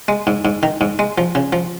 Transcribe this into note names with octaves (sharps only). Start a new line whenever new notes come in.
G#3
G#2
G#2
D#3
G#2
G#3
F3
C#3
F3